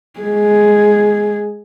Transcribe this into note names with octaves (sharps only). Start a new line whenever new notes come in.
G#3 G#4